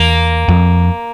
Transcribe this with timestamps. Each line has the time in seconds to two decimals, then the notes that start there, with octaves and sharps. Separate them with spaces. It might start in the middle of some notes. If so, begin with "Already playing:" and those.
Already playing: E2 A#3
0.48 F2